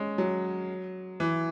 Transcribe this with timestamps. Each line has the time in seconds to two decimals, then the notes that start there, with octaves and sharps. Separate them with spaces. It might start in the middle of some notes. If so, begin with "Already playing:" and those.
Already playing: G#3 C#4
0.18 F#3
1.20 E3